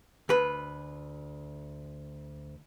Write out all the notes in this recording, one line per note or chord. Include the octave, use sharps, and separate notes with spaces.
D2 B4